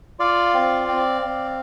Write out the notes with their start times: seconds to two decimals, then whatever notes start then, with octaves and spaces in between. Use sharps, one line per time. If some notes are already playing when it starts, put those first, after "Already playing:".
0.19 F4 D5 F5
0.54 C4
0.88 C4
1.22 C4